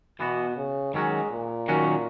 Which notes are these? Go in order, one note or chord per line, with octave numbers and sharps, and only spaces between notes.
B2 E3 B3 F#4
C#3
D#3 F#3 G#3 C#4 F#4
A#2
D#3 F#3 C#4 F#4